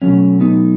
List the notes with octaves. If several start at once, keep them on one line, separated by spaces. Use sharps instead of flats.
B2 F#3 A3 C#4
B3 D#4